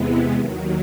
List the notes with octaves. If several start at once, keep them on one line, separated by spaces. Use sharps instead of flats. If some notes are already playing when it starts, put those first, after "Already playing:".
Already playing: E2 C3 E3 G#3 B3
D#2 D#3 F#3